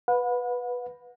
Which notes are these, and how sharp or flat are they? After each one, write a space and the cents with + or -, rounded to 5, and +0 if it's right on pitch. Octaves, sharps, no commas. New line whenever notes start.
B4 +0 F#5 -40